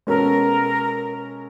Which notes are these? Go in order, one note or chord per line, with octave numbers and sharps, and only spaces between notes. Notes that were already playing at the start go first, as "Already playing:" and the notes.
B2 G#3 C#4 F#4 A4 A#4
A#4